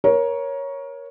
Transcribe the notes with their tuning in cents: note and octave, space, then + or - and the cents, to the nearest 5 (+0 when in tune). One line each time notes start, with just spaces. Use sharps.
A#4 +20 C#5 +0